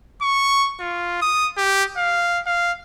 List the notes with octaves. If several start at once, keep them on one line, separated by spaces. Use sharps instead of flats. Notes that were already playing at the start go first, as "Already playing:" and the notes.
C#6
F4
D#6
G4
F5
F5